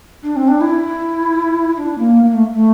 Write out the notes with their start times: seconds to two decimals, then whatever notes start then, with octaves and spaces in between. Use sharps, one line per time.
0.23 D4
0.36 C4
0.48 D4
0.61 E4
1.73 E4
1.78 D4
1.98 A#3
2.23 A#3
2.34 A3
2.53 A3